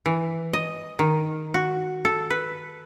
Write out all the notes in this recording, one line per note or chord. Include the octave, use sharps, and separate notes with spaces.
E3
D#5
D#3
F#4
A4
B4